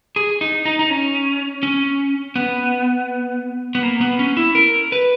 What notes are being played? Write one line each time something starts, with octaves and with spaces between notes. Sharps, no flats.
G#4
D#4
D#4
D#4
C#4
C#4
B3
B3
A#3
B3
C#4
E4
A#4
B4